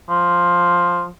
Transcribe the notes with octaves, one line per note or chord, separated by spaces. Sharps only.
F3